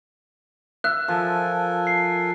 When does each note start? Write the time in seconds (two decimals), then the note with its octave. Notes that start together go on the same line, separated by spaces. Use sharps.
0.84 E5 F#6
1.08 F3 A4 A#4 G#5
1.87 C7